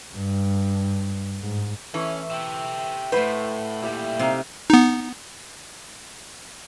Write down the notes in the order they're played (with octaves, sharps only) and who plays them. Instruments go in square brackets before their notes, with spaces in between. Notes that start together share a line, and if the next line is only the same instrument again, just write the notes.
[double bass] G2
G#2
[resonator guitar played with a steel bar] E3 [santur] A3 [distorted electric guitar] C#4
[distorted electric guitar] G4 E5
[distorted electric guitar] A2 [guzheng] A3 C5 [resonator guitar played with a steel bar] B4 [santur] F#5 E6
[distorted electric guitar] A#2 G3 [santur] E4 G4 D5
[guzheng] C3 F5 [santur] D#4 E4
[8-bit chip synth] B3 D#4